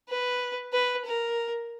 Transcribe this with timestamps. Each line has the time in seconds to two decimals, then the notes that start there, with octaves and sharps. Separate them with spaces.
0.09 B4
0.73 B4
1.05 A#4